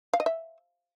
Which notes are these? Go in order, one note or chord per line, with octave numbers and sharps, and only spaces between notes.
F5
D#5
E5